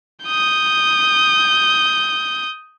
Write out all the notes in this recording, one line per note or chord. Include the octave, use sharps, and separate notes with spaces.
D#6 G6